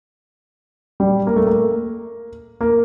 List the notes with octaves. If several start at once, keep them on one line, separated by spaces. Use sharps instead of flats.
G3
A#3
A3
A#3
A#3